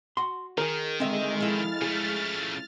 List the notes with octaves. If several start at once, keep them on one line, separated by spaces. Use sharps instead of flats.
F#4 C6
D#3 G#4 A#4
D3 G#3 C4 D#4 E5
F3 E4 F6 A6
C#3 A3 G#4